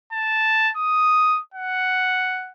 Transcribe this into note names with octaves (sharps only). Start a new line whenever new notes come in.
A5
D#6
F#5